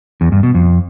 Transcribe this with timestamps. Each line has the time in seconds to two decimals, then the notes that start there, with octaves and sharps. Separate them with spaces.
0.21 E2
0.32 G2
0.43 B2
0.54 F2